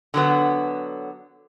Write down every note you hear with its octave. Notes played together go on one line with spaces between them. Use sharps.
D3 F#3 B3